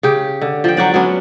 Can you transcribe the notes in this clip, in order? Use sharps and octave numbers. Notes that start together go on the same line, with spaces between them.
C#3 G4
D3
F3 G5
F#3 F#4 D5
F#3 B3 C#4 D4